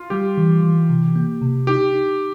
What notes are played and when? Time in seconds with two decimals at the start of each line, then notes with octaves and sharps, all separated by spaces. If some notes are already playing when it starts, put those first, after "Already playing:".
Already playing: F4
0.10 G3 G4
0.38 E3
0.63 E3
0.90 C3
1.16 A#3
1.42 C3
1.67 D#4 G4
1.94 D#4